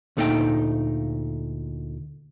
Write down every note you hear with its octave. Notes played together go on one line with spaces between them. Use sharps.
D2 A#2 A3 D#4 G#4 G5